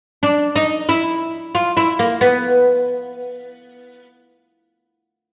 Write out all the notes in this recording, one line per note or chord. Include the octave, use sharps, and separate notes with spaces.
D4
D#4
E4
F4
E4
A#3
B3